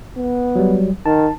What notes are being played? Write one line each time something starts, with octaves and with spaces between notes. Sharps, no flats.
B3
F#3 G3
D#3 A5